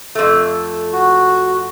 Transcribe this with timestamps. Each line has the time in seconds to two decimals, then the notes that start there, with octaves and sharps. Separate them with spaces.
0.15 F2 A3
0.93 F#4